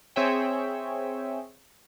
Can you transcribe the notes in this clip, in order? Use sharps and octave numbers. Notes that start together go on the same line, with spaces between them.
C4 G#4 C#5 E5 G5